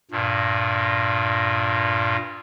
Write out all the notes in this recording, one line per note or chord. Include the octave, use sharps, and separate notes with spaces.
G2 A#2